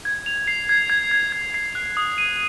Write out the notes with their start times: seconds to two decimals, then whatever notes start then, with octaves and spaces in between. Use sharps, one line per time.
0.05 G#6
0.26 F7
0.47 C7
0.69 G#6
0.90 G#6
1.11 G#6
1.32 G#6
1.54 C7
1.75 F#6
1.97 D#6
2.18 D#7